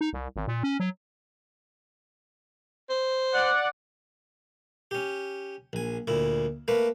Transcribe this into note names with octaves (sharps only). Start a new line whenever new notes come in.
D#4
C2
G#1
A#2
C#4
F#3
C5
D5 F#5
C#4 G4
A#1 G#5
D2 A#2 E4
A3 A#3 B4